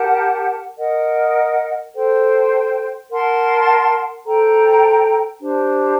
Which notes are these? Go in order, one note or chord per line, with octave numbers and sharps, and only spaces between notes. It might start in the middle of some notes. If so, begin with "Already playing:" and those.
Already playing: G4 A#4 F#5 A5
A#4 D#5 F#5
A4 C5 G5
A#4 F#5 A5 C6
A4 C5 G5 A#5
D4 G4 C5